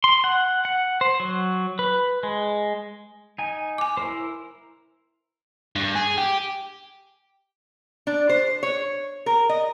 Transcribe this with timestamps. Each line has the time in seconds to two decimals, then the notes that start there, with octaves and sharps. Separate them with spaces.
0.04 C6
0.24 F#5
0.65 F#5
1.01 C5
1.20 F#3
1.79 B4
2.23 G#3
3.38 D#4 G#5
3.78 G#5 D6
3.97 E4 A#4 C5
5.76 G2
5.96 G#4
6.18 G4
8.07 D4
8.29 C5
8.63 C#5
9.26 A#4
9.49 D#5